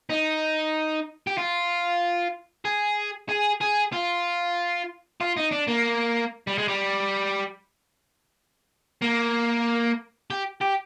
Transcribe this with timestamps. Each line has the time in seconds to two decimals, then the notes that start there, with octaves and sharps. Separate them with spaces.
0.10 D#4
1.27 G4
1.38 F4
2.65 G#4
3.29 G#4
3.61 G#4
3.93 F4
5.21 F4
5.37 D#4
5.51 D4
5.67 A#3
6.47 G3
6.58 G#3
6.68 G3
9.02 A#3
10.30 G4
10.61 G4